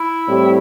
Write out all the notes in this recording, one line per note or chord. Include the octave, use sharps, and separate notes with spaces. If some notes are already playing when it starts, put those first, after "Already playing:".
Already playing: E4
A2 G3 C4 G4